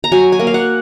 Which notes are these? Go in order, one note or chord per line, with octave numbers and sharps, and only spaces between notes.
A#5
F#3 G#5
G#5
A#3
F5
F#5